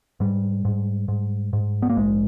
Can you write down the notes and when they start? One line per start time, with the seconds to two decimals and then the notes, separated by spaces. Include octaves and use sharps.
0.20 G#2 G3
0.65 G#2
1.08 G#2
1.53 G#2
1.82 B3
1.89 A#3
1.96 A#1 G#3